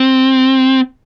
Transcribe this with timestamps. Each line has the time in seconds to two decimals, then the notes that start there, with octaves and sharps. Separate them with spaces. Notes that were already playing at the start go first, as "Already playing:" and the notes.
Already playing: C4